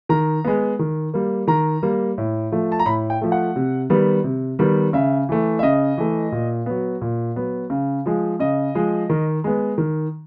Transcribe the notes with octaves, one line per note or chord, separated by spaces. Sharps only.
D#3 A#5
G#3 B3
D#3
G3 A#3
D#3 A#5
G3 A#3
A2
F3 A3
A5
A#5
A2 B5
G5
F3 A3
F#5
C3
D#3 G3 B3
C3
D#3 G3 B3
C#3 E5
E3 A3
E5
C#3 D#5
E3 A3
A#2
F#3 B3
A#2
F#3 B3
C#3
F3 G#3
C#3 D#5
F3 G#3
D#3
G#3 B3
D#3